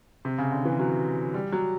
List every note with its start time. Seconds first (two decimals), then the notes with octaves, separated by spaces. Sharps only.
0.25 C3
0.38 C#3
0.52 D3
0.65 E3
0.79 F#3
1.34 G3
1.52 F#3